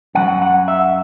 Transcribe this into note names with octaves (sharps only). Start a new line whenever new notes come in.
F#2 F#3 F#5
F#5
E5